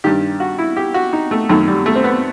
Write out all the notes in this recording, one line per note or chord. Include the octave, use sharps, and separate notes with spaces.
G2 D#3 G4
F#4
E4
G4
F#4
D#4
A3
F#2 D#3 A3
G3
A3
C4
B3